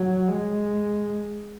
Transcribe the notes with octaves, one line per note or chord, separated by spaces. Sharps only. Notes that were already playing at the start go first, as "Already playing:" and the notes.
Already playing: F#3
G#3